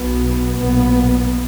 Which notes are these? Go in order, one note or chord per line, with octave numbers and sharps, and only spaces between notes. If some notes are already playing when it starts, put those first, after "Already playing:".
Already playing: B1 B2 B3
B1 A#2 B3